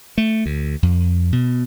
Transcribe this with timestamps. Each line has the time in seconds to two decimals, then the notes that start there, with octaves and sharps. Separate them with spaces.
0.18 A3
0.46 D2
0.83 F2
1.32 B2